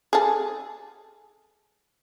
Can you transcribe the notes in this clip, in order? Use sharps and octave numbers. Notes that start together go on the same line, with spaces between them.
G#4 A4